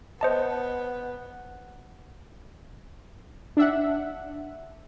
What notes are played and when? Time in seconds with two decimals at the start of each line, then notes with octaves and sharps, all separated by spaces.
0.21 B3 C5 D#5 A5
3.57 D4 E5 F#5